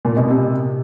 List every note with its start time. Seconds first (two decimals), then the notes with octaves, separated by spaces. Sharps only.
0.05 A#2
0.17 B2
0.28 C3